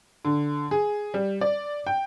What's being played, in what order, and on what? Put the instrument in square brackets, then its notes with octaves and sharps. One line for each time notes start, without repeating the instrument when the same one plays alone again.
[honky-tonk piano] D3
G#4
G3
D5
G5